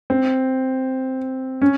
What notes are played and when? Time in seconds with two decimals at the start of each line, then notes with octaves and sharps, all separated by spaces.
0.10 C4
1.62 C#4